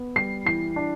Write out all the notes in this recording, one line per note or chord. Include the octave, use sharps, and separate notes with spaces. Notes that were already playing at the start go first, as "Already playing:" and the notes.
Already playing: B3
G3 C7
E3 C7
D4